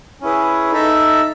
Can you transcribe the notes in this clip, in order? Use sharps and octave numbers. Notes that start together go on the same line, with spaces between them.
C#4 E4 G#4 B4
D#4 A4 E5